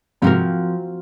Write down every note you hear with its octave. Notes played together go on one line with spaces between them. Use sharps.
G#2 C3 F3 C4 F#4 A#4